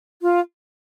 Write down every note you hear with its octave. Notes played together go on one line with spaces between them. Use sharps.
F4